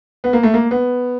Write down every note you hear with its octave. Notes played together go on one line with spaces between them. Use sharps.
B3
A#3
A3
A#3
B3